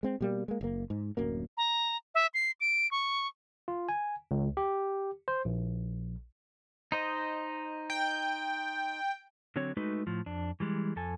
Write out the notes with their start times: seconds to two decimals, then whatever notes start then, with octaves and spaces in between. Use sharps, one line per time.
0.03 G#3 C4
0.21 B2 G3 A#3
0.48 G#3 A#3
0.61 F#1 A#3
0.90 G#2
1.17 D1 F#2 A#3
1.57 A#5
2.15 E5
2.34 C7
2.60 D7
2.91 C#6
3.68 F4
3.89 G#5
4.31 C#2
4.57 G4
5.28 C5
5.45 A#1
6.92 D#4 C5 D#5
7.90 G5
9.56 D3 F#3 C4 C#5
9.77 G#3 A3 D#4 F#4 B4
10.07 A2 F3
10.26 F2 D4
10.60 E3 G3 G#3
10.96 F2 A4 G#5